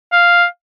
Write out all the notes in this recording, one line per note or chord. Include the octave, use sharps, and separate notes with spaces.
F5